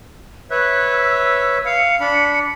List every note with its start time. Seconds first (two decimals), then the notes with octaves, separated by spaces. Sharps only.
0.51 B4 C#5 E5 F#6
0.93 E6
1.66 F5 C#7
2.00 D4 B5